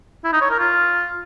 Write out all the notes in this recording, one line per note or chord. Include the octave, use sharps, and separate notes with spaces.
E4
D#4
C#5
A#4
F4